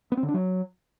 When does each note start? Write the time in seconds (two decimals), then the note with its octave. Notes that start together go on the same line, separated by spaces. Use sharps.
0.12 B3
0.17 C4
0.23 D3
0.28 D4
0.34 F#3